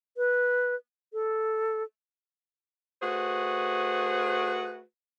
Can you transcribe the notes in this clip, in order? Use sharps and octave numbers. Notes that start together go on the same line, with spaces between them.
B4
A4
A3 F#4 G#4 B4 C5